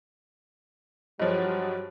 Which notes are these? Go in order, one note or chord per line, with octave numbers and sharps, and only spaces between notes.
G2 F3 F#3 G#3 C#5 D#5